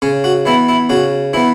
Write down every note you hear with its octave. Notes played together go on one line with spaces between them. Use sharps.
C#3 C#4
F#4
E3 B3 E4
E4
C#3 F#4
E3 B3 E4